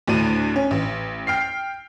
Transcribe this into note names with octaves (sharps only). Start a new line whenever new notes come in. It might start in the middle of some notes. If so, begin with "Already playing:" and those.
D2 A2 D4 D#7
C#4
A1
G5 F6 C7